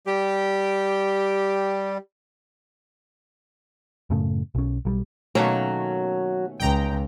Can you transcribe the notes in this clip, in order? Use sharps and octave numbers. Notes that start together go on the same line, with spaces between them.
G3 G4
F#2 A2 C#3 A3
B1 C#4
B1 F#3 G3
B2 D#3 F#3 A3 A#3 C#4
C#2 G5 A#5